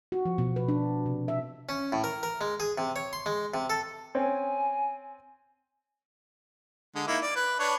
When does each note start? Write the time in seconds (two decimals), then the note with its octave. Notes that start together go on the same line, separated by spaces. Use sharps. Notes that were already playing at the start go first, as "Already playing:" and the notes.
0.12 F#4
0.25 F3
0.38 B2
0.56 B4
0.68 D4
1.06 C3
1.28 E5
1.69 C#4
1.92 A2
2.04 A#4
2.23 A#4
2.41 G#3
2.60 G#4
2.78 C3
2.96 C#5
3.13 C6
3.26 G#3
3.54 C3
3.70 A4
4.15 C4 C#4 G#5
6.95 D3 G#3
7.07 A#3 D#4 E4
7.22 D5
7.36 B4
7.59 D4 B4 C#5